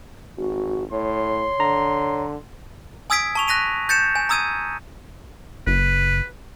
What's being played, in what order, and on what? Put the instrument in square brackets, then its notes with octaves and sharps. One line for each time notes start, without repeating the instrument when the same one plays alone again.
[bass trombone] G#1 [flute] F#4
[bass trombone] A2 [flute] C#5 [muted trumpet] C6
[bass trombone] D3 [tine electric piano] A#5
[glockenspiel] G#5 D#6 E6 G#6 B6 D7
A5 C#6 F7
F#6 A#6 B6 D#7 F7
G6 A6 C#7 E7
G#5
A#5 D#6 E6 G#6 D#7
[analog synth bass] F#1 [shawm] B4